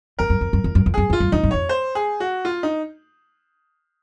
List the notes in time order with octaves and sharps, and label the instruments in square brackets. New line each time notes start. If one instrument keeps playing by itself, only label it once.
[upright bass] F2 [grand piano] A#4
[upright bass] F#2
F2
F#2
F2
F#2
F2
[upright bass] F#2 [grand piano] G#4
[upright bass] F2 [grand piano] F4
[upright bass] F#2
[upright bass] F2 [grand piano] D#4
[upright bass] F#2
[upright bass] F2 [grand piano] C#5
[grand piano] C5
G#4
F#4
F4
D#4